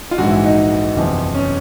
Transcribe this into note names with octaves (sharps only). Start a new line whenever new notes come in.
F4
A#1 G#2 E3 F#4
E4
D#4
F#1 E2 C3 F3
C#4